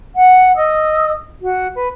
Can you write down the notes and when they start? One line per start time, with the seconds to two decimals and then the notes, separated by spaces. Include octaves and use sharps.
0.15 F#5
0.56 D#5 D#6 E6
1.41 F#4
1.75 B4